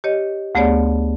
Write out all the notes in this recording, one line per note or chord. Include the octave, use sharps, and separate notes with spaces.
G4 C#5 D#5
D2 A3 B3 G#4 C#5 D5